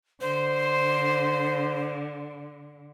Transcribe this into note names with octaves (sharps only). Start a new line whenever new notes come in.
D3 C5